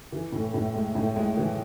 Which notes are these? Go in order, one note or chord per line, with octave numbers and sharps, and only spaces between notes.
E3
A2
A2
G#3
A2
G#3
E3